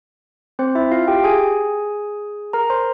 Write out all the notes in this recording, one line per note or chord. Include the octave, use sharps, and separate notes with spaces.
C4 C5
E4 E5
F4 F5
G4 G5
G#4 G#5
A#4 A#5
C5 C6